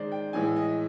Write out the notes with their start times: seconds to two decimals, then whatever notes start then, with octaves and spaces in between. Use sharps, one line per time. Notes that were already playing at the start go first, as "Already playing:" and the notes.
Already playing: D#3 G#3 C5 D5
0.12 G5
0.33 A2 E3 G#3 G#5
0.56 D#5